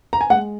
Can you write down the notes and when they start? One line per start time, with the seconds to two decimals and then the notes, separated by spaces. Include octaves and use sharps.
0.13 A#5
0.21 G#5
0.30 G#3 F#5